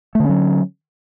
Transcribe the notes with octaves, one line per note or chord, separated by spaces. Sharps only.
D3 F#3 A3 C#4